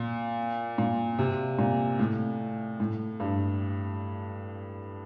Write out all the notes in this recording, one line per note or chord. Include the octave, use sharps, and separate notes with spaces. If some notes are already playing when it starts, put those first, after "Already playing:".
Already playing: A#2
A#2
C3
A#2
A2
A2
G2